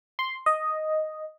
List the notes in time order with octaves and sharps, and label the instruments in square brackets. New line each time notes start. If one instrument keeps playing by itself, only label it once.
[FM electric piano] C6
D#5